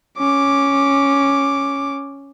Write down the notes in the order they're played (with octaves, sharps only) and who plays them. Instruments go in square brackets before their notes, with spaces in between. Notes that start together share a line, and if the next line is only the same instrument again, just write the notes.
[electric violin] C#4 D6